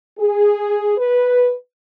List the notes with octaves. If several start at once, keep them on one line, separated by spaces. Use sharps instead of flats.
G#4
B4